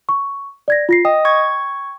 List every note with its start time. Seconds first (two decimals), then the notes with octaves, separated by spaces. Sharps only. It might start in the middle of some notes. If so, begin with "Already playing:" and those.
0.09 C#6
0.68 D5 G#6 A#6
0.89 F4 A#6 C7
1.05 D#5 G5 D#6
1.25 C#6 G#6